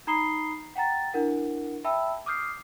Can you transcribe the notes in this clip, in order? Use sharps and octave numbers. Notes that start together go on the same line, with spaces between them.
D#4 A#5 B5 D#6 C7 G7
F#5 G5 A#5 A6
D4 E4 A#4 F#5
E5 G5 A5 B5 E6
D6 D#6 F6 G6 C7